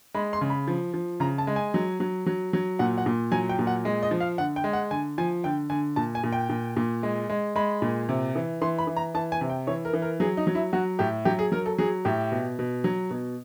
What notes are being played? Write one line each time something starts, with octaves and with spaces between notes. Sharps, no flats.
G#3 B5
C6
C#3
B5
F3
F3
C#3 A#5
A5
G#3
G#5
F#3
F#3
F#3
F#3
A#2 F#5
F#5
A#2
F#3 G#5
G5
A#2
F#5
G#3
D#5
F3
F5
D3 F#5
G5
G#3
F#5
D3 G#5
F3 G#5
D3 G5
D3 G#5
A#2 A5
G#5
A#2
G5
A#2
A#2
G#3
G#3
G#3 B5
A#2
C3
E3
E3 C6
B5
E3
A#5
E3 A5
G#5
C3
G5
E3 C#5
A#4
E3
A#4
F#3 G#4
D#4
F#3
E4
F#3 F#4
A2 G4
F#3 G4
G#4
F#3 A#4
A4
F#3 G#4
A2 G4
B2
B2
F#3
B2